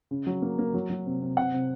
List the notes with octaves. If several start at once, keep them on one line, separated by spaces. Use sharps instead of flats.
C#3
F#3
A#3
A#3
F#3
F#3
C3
C3
C3 F#5
C3